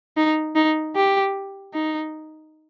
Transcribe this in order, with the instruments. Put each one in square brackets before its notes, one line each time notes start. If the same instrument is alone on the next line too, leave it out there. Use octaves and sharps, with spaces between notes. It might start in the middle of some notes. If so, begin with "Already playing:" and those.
[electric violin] D#4
D#4
G4
D#4